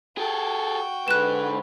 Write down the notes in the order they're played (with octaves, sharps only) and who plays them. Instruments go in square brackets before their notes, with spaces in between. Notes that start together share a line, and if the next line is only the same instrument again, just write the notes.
[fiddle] F#4 G5 [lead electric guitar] G#4 A4
[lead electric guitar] G#2 [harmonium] D3 B4 [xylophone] F#6 E7